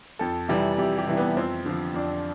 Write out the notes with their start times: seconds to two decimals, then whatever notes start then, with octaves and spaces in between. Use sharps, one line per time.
0.19 F2 A4
0.49 C3 E3 G3
0.78 F2 G4
0.98 G4
1.07 C3 E3 G3
1.18 B3
1.37 F2 C4
1.66 D3 F3
1.94 F2 D4